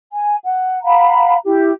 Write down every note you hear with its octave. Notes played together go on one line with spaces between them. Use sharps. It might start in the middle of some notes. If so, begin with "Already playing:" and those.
G#5
F#5
F5 F#5 A#5 B5
E4 G4